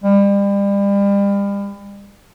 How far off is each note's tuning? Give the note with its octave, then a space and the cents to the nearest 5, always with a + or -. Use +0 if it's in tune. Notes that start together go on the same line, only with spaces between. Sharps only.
G3 +35